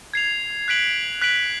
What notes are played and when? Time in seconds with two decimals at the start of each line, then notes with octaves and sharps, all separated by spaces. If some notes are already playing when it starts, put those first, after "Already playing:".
0.14 G#6 C7 F7
0.68 F#6 B6 D7 F#7
1.22 F#6 B6 D7 F#7